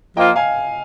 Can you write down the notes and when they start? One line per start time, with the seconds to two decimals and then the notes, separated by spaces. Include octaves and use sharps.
0.16 F3 A#3 F4 D#5 G5
0.36 F5 G#5